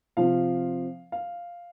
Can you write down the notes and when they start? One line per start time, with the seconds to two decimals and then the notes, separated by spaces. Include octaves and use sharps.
0.17 C3 F3 F5
1.12 F5